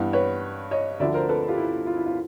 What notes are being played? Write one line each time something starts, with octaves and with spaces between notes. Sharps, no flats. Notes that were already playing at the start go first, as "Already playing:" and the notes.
Already playing: G2 E3 G3 B3
B4 C#5
C#5 D#5
D2 D3 F3 D5 E5
A#4 C5
A4 B4
F4 G4
E4
F4
E4
F4